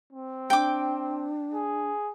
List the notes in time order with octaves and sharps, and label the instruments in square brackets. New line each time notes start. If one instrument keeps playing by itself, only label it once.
[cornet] C4
[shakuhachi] D4 [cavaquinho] G5 D6
[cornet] G#4